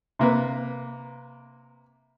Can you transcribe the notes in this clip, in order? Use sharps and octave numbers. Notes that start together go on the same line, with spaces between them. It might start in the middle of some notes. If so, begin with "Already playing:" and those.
C3 A#3 B4